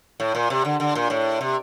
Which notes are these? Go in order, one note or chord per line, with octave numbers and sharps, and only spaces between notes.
A2
A#2
C3
D3
D3
A#2
A2
C3